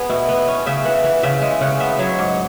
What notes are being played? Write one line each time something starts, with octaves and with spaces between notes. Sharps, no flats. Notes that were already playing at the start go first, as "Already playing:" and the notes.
Already playing: B3 G#4
B2 E4
B3
C#4
C#3 E5
E3 F#5
E3
C#3 E5
G#3
C#3 F#5
B3 E5
F#3 C#5
G#2